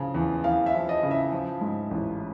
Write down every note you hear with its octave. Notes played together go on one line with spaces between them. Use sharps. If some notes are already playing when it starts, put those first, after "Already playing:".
Already playing: C#3 F3
E2
E2 F5
E5
F3
D#5
C#3
E5
F3
G#2
A1